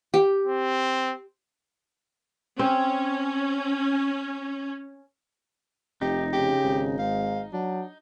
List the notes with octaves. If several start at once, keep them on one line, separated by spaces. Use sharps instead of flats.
G4
C4
C4 C#4
F1 D#4 G4
C#3 G4
G#1
G#2 F5
F#3 D4